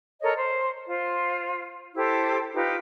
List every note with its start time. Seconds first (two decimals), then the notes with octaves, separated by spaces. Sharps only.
0.22 A4 A#4 C#5 D#5
0.35 C5
0.87 F4 C5
1.95 E4 G4 A4 C5
2.53 D#4 F4 G4 B4